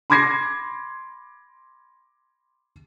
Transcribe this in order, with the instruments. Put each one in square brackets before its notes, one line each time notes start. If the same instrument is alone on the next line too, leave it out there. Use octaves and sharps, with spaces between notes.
[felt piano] B5 C6 D6 G#6 A#6 C7